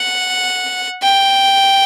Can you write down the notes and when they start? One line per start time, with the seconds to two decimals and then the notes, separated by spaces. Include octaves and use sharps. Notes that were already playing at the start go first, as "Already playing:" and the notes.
Already playing: F#5
1.03 G5